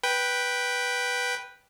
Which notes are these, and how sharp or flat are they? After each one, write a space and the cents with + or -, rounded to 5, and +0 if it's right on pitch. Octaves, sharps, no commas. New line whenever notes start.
B4 -5 G5 +0